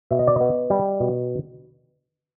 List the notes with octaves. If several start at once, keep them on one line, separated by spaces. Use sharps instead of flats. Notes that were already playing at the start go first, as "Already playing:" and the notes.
B2 E5
D#5
D5
B3 D#5
G3
B2